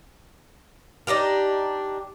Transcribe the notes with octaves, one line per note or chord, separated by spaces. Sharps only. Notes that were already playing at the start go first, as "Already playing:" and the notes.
D4 D#4 G4 A#4